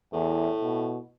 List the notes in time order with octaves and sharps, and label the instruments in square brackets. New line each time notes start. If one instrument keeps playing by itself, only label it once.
[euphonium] E2 [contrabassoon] A2
[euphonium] B2